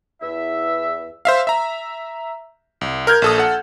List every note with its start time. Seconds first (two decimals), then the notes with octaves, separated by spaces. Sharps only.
0.21 E2 E5
1.25 C5 E5 F5
1.47 E5 A#5
2.81 C2
3.07 A#4 F6 G6 G#6
3.22 A#1 A4 D#6
3.38 A4 F#5